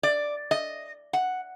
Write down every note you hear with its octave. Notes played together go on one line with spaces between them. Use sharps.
D5
D#5
F#5